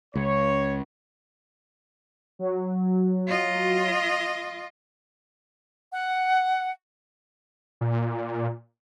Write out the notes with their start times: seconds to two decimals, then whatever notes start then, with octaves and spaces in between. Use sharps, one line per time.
0.15 C#2 C#5
2.39 F#3
3.27 F4 D#5
5.92 F#5
7.81 A#2